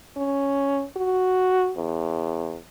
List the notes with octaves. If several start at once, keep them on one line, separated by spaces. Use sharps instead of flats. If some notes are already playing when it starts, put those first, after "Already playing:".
C#4
F#4
E2